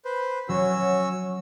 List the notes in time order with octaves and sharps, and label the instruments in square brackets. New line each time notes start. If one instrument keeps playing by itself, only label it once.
[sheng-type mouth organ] B4 C5
[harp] F#3 [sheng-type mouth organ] C#4 F#4 E6